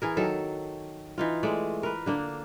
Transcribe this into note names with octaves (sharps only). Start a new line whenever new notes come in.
E3 G#4 A#4
D#3 F#3 A4
E3 D#4 F4
G#3 A3 D5
A#4 B4
D3 A#3 D4